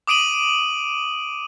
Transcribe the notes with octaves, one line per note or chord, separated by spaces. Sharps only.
D6 D#6 D7 D#7 F#7